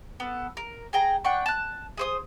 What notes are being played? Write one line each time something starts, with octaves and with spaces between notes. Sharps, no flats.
B3 A4
A#4
G#4 G5 A#5
D4 F#5 G5 C#6
A5 F#6
G#4 C5 D#6